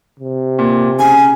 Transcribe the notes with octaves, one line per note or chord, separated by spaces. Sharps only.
C3
A#2
C#3 G#5